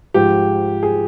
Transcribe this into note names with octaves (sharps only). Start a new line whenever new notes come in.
G#2 F3 G4
G#4